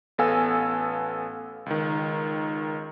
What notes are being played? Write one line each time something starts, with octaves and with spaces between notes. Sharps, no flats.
A1 B3 A4 F5 G#5 E6
C#2 D#3